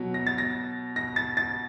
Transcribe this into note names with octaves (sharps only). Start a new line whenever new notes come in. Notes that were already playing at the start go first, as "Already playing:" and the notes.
Already playing: B2 F#3
A#6
A6
A#6
A#6
A6
A6